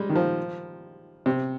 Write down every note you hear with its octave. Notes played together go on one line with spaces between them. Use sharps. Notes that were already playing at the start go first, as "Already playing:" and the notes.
Already playing: G3 G#3
D#3
F3
C3